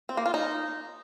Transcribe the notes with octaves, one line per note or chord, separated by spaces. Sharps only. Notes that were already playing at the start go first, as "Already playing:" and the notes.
C4
A#3
F4
D#4